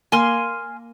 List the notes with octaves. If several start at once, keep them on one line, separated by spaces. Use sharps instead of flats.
A#3 G#5 C6 F6